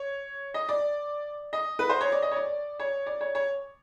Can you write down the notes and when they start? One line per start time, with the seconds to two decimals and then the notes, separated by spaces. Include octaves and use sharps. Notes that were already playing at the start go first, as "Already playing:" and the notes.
Already playing: C#5
0.54 D#5
0.69 D5
1.53 D#5
1.79 B4
1.89 C5
2.01 C#5
2.12 D5
2.22 D#5
2.31 C#5
2.36 D5
2.80 C#5
3.06 D5
3.21 C#5
3.35 C#5